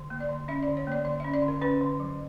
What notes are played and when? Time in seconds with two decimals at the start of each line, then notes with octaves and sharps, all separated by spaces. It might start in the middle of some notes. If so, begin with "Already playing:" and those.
Already playing: D3
0.10 A#3
0.20 D5
0.29 D3
0.48 C#4 E5
0.63 D5
0.68 D3
0.77 C#5
0.87 A#3 D5
1.05 D3 D5
1.20 E5
1.24 C#4
1.34 D5
1.42 D3
1.48 A#4
1.61 C#4 B4
1.81 D3
2.00 F#3